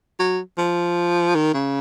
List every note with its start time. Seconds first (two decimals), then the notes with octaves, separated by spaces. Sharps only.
0.19 F#3
0.58 F3
1.35 D#3
1.54 C#3